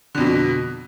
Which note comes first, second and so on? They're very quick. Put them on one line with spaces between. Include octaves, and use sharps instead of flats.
D3 F2 B2